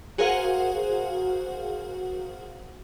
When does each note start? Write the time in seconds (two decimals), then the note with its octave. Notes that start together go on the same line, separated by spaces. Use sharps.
0.18 F#4 G#4 A#4 C5 F5 F#5